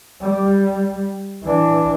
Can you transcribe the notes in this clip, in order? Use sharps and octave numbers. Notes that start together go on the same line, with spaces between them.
G3
E3 D4